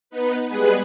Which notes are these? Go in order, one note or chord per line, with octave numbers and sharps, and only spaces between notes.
B3 D#4 B4
G3 G#3 B3 G#4 B4 F#6